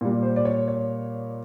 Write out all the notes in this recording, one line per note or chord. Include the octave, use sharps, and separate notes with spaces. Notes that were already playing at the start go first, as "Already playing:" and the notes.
A#2 G3
C5
D5
C#5
C#5